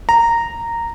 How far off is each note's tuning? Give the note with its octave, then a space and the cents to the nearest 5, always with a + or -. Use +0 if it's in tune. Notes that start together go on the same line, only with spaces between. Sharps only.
A#5 -10